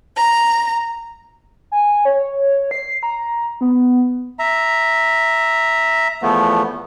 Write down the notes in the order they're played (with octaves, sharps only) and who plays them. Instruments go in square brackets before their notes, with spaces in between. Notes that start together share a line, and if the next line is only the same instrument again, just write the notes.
[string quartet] A#5
[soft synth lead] G#5
C#5
C7
A#5
B3
[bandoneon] E5 A#5
E2 F3 A3 B3